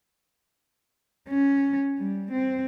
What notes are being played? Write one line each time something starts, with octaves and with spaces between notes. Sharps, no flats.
C#4
G3
C4